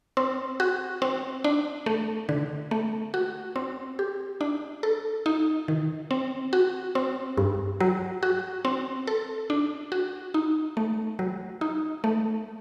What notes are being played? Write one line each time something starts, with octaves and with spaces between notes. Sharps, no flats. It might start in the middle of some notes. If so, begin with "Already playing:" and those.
C4
F#4
C4
D4
A3
D3
A3
F#4
C4
G4
D4
A4
D#4
D#3
C4
F#4
C4
G2
F#3
F#4
C4
A4
D4
F#4
D#4
A3
F#3
D#4
A3